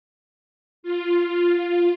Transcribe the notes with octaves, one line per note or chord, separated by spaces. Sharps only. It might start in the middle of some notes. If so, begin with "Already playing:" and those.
F4